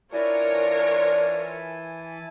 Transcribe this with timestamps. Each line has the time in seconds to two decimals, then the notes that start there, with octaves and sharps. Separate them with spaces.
0.13 E3 D4 E4 F4 A#4 C#5 G#5 A5